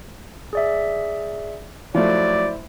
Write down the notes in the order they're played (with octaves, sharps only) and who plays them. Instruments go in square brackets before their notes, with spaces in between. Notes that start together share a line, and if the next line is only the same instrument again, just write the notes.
[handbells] G#4 D5 E5
[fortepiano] F3 A3 [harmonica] F#3 D5 [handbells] E4 C5 E5